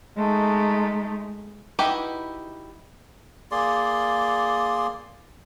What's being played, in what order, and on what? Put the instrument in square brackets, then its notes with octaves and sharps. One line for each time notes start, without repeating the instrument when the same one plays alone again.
[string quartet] G#3 A3 D#4
[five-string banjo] D#4 E4 F#4 G4 B4
[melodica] A#3 G#4 D5 C6